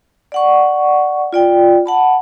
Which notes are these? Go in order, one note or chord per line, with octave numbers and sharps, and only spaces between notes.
D5 F#5 C#6
F4 D5 G5
F#5 A5 B5